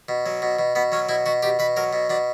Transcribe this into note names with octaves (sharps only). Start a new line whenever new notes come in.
B2
F#3
B2
B2
B2 B3
F#3 C#4
B2 E4
B2 F#4
B2 G4
B2 B4
F#3 A#4
B2
B2 D4